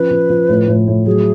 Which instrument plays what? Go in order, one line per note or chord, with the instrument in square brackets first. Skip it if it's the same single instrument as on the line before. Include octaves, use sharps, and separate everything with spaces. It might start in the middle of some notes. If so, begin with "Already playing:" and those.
Already playing: [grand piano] F3 C#4 [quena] B4
[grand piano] F3
F3
A2
A2
A2
[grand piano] F#3 [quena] G#4